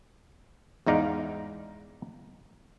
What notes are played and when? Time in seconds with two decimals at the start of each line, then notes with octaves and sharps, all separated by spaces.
0.86 E2 G#2 D#4 D5 F5 F#5